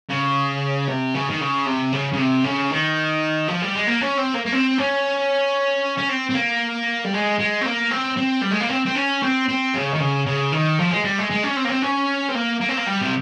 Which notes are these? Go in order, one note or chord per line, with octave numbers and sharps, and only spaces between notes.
C#3
C3
C#3
D#3
C#3
C3
C#3
C#3
C3
C#3
D#3
F3
G3
G#3
A#3
C#4
C4
A#3
A#3
C4
C#4
C#4
C4
C4
A#3
G3
G#3
G#3
C4
A#3
C4
C4
G3
G#3
A#3
C4
C4
C#4
C4
C4
C#3
D#3
C#3
C#3
D#3
F3
G#3
G3
G#3
G#3
C#4
C4
A#3
C4
C#4
C4
A#3
A#3
C4
A#3
G3
C3